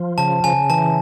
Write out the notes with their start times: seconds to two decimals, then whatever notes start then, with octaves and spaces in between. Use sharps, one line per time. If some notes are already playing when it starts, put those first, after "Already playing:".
Already playing: F3
0.18 C#3 A5
0.44 C#3 G#5
0.70 E3 A5